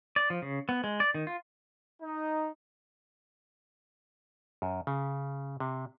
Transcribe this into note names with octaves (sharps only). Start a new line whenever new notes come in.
D5
F3
C#3
B3
G#3
D5
D#3
F4
D#4
F#2
C#3
C3